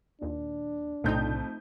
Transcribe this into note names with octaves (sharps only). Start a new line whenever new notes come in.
D#2 A#2 D4
B1 F2 A2 C3 A3 C4 D#4 G6